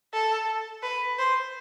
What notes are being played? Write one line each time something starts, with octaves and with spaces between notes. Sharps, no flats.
A4
B4
C5